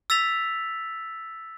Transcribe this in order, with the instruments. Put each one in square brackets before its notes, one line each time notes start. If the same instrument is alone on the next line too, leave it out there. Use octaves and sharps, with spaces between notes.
[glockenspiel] E6 A6 B6 F7